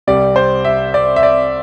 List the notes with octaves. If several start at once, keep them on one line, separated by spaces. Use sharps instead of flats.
C2 C3 G3 D5
C5
E5
D5
E5
D5